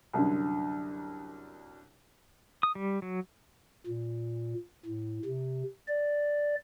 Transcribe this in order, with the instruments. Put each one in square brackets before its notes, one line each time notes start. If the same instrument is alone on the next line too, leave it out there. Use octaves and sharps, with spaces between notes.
[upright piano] C2 F#2 D3
[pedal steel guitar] D#6
G3
F#3
[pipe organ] A#2
A2
C3
D5